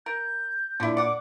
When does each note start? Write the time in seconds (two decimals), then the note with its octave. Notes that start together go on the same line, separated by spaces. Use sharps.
0.06 A#4 G6
0.80 A#2 D3 D4 E4
0.97 D5 F#5 D6